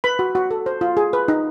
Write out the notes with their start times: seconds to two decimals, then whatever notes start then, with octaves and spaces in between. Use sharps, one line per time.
0.04 B4 B5
0.19 F#4
0.35 F#4
0.51 A4
0.66 C5
0.81 F4
0.97 G#4
1.13 B4
1.28 D#4